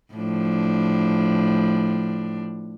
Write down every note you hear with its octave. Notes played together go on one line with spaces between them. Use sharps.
A2 F3 D4